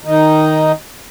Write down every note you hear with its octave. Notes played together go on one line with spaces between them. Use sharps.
D#3 D#4